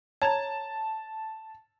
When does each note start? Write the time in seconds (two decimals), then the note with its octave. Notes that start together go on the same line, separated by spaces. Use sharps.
0.22 C#5 A5 A#5 G#6